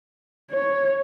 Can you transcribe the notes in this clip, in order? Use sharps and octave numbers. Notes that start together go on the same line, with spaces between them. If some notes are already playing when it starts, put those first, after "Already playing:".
C#5